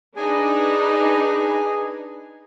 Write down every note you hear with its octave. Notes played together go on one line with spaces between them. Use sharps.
D4 D#4 G#4 B4 G#5